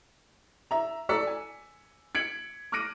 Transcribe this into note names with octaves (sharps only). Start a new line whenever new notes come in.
E5 A#5
A4 D5 A#5 E6 B6 C#7
G#5
G#6 B6 C#7 D7 F#7
D6 F6 F#6 A#6 D7 D#7